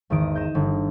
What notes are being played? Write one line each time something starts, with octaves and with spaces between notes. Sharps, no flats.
G#1 E2 D#3 D#6 D7
G6 A#6 D#7 E7
G1